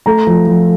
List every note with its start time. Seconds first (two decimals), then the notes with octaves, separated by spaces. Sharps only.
0.06 A3 A#5
0.27 F3
0.47 F3